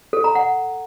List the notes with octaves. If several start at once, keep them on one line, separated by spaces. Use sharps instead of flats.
A4
A#5
F#5